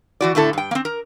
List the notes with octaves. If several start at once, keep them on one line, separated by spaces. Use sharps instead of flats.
E3 F#4 D5
A2 D3 E4 A4
G2 G5
A#3 C4
A#4